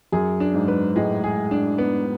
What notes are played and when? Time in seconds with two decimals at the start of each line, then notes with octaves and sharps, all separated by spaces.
0.12 F#2 G#4
0.40 D4
0.54 G#2
0.68 B4
0.96 A2 G#3
1.24 G#4
1.51 D4
1.78 B3